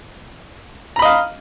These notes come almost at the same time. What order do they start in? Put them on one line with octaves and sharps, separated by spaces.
A#5 B5 D#5 F5